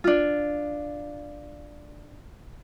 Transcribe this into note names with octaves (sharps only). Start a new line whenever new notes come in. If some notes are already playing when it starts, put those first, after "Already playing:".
D4 F4